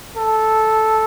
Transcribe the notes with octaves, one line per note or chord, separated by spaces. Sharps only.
A4